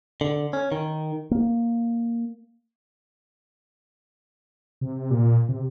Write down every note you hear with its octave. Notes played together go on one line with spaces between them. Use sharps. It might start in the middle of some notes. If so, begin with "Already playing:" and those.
D3
C#4
D#3
A#3
C3
A#2
C3